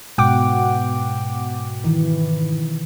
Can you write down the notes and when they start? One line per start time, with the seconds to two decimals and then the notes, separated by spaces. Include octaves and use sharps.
0.18 G#2 B2 F#5 G5 D6
1.84 D#3 E3